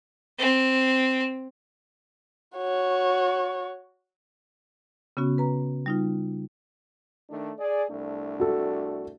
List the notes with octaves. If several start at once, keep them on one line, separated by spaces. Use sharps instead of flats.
C4
F#4 C#5
C#3 B3 C#4 F#4
B4 A#5
G3 D#4 F4
D#3 A3 D4
G#4 D5
C2 A3 D4
F#4 A4